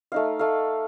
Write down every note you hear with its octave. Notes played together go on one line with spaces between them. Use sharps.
A3 D#4 F5
A3 F5